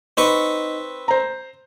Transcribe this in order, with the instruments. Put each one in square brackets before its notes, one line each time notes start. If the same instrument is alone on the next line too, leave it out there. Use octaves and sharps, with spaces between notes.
[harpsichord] C4 B4 C#6 [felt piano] D#4
[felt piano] C5 A#5